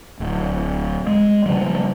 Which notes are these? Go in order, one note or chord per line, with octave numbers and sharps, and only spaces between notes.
D1
G#3
C#3 F3 G3